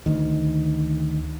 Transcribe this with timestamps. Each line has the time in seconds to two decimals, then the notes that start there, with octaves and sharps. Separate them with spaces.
0.06 D2 D#3